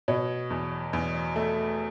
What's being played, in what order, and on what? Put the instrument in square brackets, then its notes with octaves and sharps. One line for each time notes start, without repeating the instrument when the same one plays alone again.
[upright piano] B2 C#5
E2
E2
A3